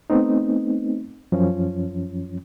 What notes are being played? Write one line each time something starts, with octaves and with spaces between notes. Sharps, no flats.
A3 B3 C4 D#4
F#2 F3 C#4